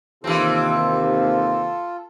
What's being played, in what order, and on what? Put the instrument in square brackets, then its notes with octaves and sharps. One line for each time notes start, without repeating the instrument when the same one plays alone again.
[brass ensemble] D#2 C3 [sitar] E3 C4 [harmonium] F4 A4